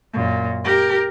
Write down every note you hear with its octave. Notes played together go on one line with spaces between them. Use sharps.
F#2 A#2
G4 A#4